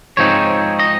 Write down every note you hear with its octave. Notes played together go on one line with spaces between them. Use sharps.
G#2 F3 C4 D#4 C#5
D#5